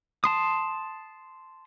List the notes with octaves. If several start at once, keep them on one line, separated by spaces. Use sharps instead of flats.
A5 C6 D#6